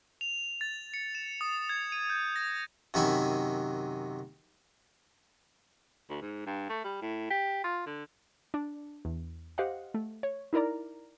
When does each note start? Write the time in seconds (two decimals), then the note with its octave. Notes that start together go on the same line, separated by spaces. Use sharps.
0.21 F7
0.61 A6
0.94 C#7
1.15 E7
1.41 D#6
1.69 G#6
1.92 D#7
2.10 G6
2.36 A#6
2.94 F#2 C3 D#3 E5 G#5 B5
6.10 D2
6.21 G#2
6.46 G2
6.69 A3
6.84 G3
7.02 A2
7.30 G4
7.64 F4
7.86 D3
8.54 D4
9.05 E2
9.58 G4 C5 D#5 F5 F#5
9.94 A3
10.23 C#5
10.53 D#4 E4 A#4 D5 A#5